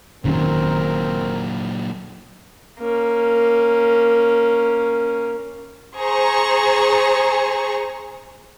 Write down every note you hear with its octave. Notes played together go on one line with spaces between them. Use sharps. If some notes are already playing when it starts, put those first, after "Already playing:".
F1 A#2 D#3 F#3 C4 C#4 A#4
A#3 C#4
G#4 C5 A#5 C#6